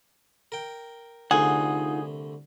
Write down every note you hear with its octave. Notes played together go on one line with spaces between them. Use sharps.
A#4 G5
C2 D3 A3 D#4 F4 G#4 F#5